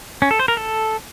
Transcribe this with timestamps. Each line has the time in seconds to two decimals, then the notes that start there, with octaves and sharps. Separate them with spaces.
0.22 C#4
0.31 A4
0.39 C5
0.48 A#4
0.57 A4